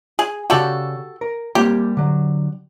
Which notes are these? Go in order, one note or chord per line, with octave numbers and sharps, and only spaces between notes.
G#4
C#3 F#4 G4 A4 D5 F5
A#4
G3 A#3 C4 G4
D3 F#3